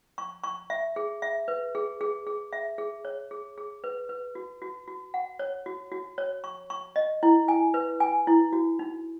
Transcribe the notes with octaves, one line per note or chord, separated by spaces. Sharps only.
C#6
C#6
E5
G#4
E5
B4
G#4
G#4
G#4
E5
G#4
C#5
G#4
G#4
B4
B4
F#4
F#4
F#4
F#5
C#5
F#4
F#4
C#5
C#6
C#6
D#5
E4
G#5
B4
G#5
E4
F#4
D#4